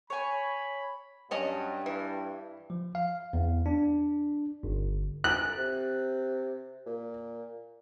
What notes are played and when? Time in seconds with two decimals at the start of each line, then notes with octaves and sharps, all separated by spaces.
0.10 C#5 G#5 B5
1.31 G2 F#3 C#4 D#5
1.86 E3
2.70 F3
2.95 F5
3.33 E2
3.66 D4
4.63 G1
5.24 F#6
5.57 C3
6.86 A#2